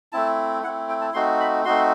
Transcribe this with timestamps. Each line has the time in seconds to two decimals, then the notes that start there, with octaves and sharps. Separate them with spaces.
0.12 A3 C4 E4 A5
0.63 A3 C4 E4 F#5
0.89 G5
1.01 A5
1.14 A3 C4 D#4 F#4 C6
1.40 B5
1.65 A3 C4 D#4 F#4 C6